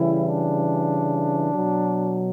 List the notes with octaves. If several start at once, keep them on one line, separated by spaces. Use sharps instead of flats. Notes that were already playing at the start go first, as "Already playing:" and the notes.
Already playing: C#3 E3 G3 E4
D4
B2 F#3